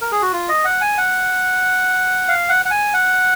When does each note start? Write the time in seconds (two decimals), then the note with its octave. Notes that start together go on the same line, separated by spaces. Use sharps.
0.01 A#4
0.12 G#4
0.22 F#4
0.33 F4
0.49 D#5
0.65 F#5
0.81 G#5
0.98 F#5
2.28 F5
2.49 F#5
2.65 F#5
2.71 G#5
2.94 F#5